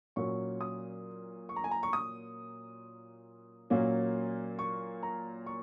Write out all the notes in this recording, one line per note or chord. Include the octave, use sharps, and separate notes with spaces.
A#2 F#3 C#4 C#6
D#6
C#6
A#5
G#5
A#5
C#6
D#6
A#2 F#3 A#3 C#4
C#6
A#5
C#6